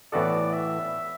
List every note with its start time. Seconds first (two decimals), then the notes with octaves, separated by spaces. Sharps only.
0.12 A2 E3 B3 F#4 A4 D5
0.53 E5